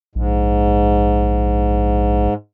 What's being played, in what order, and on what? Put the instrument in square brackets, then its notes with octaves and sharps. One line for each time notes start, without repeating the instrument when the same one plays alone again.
[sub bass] A#1 [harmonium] G#2